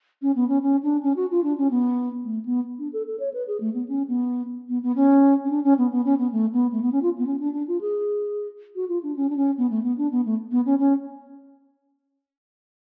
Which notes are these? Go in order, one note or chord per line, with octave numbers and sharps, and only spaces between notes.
C#4
B3
C#4
C#4
D4
C#4
F#4
F4
D4
C#4
B3
A3
B3
D4
A4
A4
C#5
B4
G#4
A3
B3
C#4
B3
B3
B3
C#4
C#4
D4
C#4
B3
B3
C#4
B3
A3
B3
A3
B3
C#4
F4
B3
C#4
D4
D4
F4
G#4
F#4
F4
D4
C#4
D4
C#4
B3
A3
B3
D4
B3
A3
B3
C#4
C#4